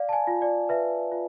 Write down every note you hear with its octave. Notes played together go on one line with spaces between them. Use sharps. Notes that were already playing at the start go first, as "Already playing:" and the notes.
Already playing: D5 F5
A5
G#5
F4
D5
B4 E5
F4